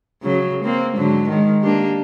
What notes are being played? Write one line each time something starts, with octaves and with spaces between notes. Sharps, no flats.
C#3 F#3
A#3 C4
G#2 D3 F#3
D#3 G#3
A#3 D4 G4